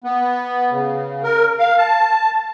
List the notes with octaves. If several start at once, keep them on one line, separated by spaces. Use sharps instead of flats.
B3
C#3
A#4
F5
A5